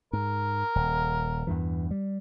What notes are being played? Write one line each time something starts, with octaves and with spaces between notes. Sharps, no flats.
G#2 A#4
D#1
E2 G2 E3
G3